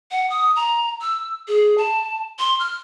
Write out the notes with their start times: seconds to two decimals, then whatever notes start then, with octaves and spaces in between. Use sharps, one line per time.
0.11 F#5
0.30 D#6
0.56 A#5
1.01 E6
1.48 G#4
1.78 A5
2.39 C6
2.59 F6